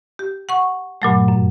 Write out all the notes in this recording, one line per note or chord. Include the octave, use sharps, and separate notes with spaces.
G4
F#5 C#6
G2 A#2 F#3 A3
F#2